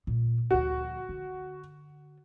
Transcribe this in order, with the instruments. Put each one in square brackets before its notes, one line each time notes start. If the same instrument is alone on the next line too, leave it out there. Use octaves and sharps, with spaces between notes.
[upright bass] A#2 A3
[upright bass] D2 F3 [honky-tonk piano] F#4
[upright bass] D3